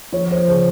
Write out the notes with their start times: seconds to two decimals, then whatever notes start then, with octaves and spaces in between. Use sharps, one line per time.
0.13 F3 C#5
0.31 C5
0.47 C#3 C5